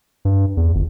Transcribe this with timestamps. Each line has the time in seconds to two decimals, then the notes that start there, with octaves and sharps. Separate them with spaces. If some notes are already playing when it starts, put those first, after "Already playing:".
0.25 G2
0.57 E2
0.75 G1